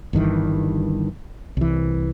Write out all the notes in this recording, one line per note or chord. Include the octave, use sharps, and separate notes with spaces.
G1 G2 D#3 E3
C2 E3